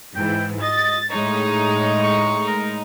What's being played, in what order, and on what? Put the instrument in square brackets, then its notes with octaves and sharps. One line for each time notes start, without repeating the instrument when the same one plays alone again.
[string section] G#2 E3 [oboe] G5
[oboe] D#5 [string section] A6
[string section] A2 G#3 D#4 [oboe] C#5
[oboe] C#6
A#4